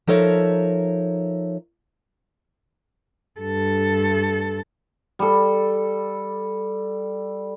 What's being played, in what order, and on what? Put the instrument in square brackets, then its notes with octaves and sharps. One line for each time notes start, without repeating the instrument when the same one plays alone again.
[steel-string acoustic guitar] F3 D#4 A4 A#4 C#5 E5
[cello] G2 A4
[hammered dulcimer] G3 A4